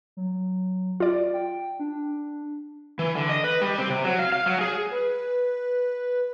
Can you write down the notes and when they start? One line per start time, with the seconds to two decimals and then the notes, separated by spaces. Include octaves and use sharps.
0.17 F#3
1.00 F4 D5
1.33 G5
1.80 D4
2.99 E3
3.15 D3
3.29 D#5
3.44 B4
3.61 G3
3.78 C4
3.90 C3
4.04 F#3
4.19 F5
4.32 F5
4.46 F#3
4.61 G#4
4.92 B4